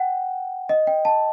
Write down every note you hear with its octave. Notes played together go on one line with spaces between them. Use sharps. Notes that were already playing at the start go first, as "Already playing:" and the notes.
Already playing: F#5 G5
D#5
G5
A5